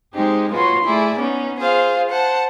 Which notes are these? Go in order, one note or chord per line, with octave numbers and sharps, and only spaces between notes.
G#3 C4 D#4 G4 G#4
F4 F#4 B4 C#5 C6
A3 E4 G#4 D5
B3 C#4 D#4
F4 G#4 C5 F5
C5 F#5 A5